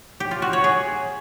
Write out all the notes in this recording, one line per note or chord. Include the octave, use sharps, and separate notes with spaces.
G4
F4
F#4
C#5
G#4